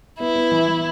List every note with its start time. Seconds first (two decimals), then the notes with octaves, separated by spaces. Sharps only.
0.20 B3 E4
0.35 B3
0.52 E3
0.68 E3